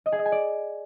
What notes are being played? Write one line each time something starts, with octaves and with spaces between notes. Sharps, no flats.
D#5
G#4
D#5
G#5
D5